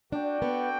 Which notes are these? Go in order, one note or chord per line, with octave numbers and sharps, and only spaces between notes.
D4 F#4 A4 D5 G5
B3